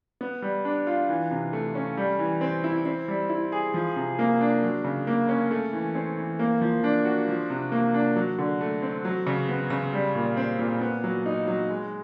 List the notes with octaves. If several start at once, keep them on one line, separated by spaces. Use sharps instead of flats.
B3
G3
D4
F4
E3
C3
A3
C#4
G3
E3
C4
E4
C4
G3
E4
G#4
F3
C3
A#3
D4
F#3
C#3
A#3
C#4
A3
E3
C4
E3
A#3
F3
D4
F#4
F3
C3
A#3
D4
F#3
D3
A3
C4
F#3
C#3
B3
C#3
G3
A#2
C4
A#2
B3
F#3
D#4
F#3
G#3